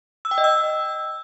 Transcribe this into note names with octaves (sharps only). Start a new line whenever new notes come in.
E6
G5
D#5
E6